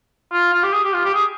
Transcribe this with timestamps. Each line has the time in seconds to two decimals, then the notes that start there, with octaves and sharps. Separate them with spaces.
0.32 F4
0.53 F4
0.63 G4
0.73 G#4
0.84 G4
0.93 F4
1.04 G4
1.14 G#4